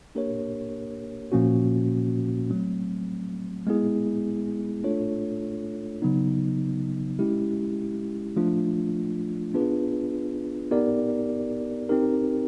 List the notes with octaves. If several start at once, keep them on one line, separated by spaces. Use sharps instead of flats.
A#3 D4 G4 A#4 C#5
A#2 F3 A#3 C#4 F#4
F#3 A3 C4
G#3 B3 E4 G#4
A3 D4 F4 A4 C#5
C#3 F#3 B3 D#4
G#3 C#4 E4 G4
F3 A3 D4 F4
B3 D4 F4 G#4 B4
B3 D#4 G4 A#4 D5
C4 D#4 G4 A#4